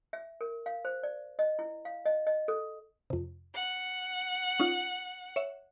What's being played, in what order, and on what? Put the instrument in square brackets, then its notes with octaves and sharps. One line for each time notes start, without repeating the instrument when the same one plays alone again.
[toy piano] E5
A#4
F5
C5
D5
D#5
E4
F5
D#5
D#5
A4
[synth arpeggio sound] F2 C3
[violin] F#5
[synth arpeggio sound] C#4 D#4 F4
C#5 E5